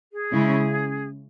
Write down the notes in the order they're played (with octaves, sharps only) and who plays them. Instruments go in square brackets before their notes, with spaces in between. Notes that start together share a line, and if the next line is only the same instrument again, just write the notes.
[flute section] G#4
[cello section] C#3 G#3 C#4 E4